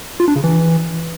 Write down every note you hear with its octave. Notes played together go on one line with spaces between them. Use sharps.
F4
D4
C#3
E3